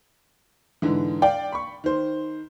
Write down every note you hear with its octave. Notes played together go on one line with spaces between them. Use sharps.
G#2 D3 E3
D5 F5 G5
B5 C#6
D#3 C5